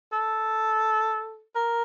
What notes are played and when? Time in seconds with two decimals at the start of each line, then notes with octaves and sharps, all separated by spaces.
0.12 A4
1.56 A#4